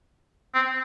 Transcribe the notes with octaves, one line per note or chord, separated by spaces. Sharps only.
C4